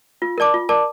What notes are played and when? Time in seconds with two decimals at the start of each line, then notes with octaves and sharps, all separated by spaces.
0.22 F4
0.38 A#4 D5 A5 D6
0.54 F4
0.69 A#4 D5 A5 D6